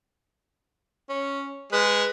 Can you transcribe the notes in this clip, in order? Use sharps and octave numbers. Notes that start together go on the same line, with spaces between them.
C#4
G#3 B4